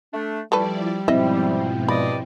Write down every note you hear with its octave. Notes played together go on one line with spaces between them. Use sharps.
A3 D4
F3 G3 A3 E4 A4 B4 D5
G#2 B2 F3 C4 E4 D#5 E5
G2 D5 D#5 B5